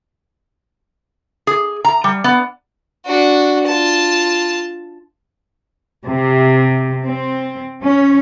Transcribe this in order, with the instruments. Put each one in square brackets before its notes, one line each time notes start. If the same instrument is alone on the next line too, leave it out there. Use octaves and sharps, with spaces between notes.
[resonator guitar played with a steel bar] G#4
A#5
G3
B3
[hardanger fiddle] D4 F#4
F4 A5
[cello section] C3
C4
C#4